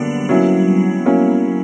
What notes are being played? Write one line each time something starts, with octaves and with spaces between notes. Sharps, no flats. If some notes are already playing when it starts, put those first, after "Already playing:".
Already playing: D3 F#3 G3 A#3 B3 D4
F#3 A#3 C#4 E4
F#3 A#3 C#4 E4